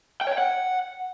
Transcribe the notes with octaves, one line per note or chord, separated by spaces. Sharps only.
G5
C#5
G5
F#5